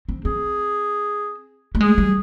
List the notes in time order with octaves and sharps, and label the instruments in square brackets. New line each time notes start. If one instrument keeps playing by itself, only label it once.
[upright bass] C4
[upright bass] C4 [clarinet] G#4
[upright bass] A3
[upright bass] G#3 [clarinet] G#4
[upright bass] G3